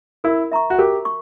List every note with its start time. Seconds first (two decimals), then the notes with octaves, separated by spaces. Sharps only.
0.24 E4 A#4
0.52 E5 A#5 C#6
0.70 F#4
0.78 G4 A#4
1.05 C#6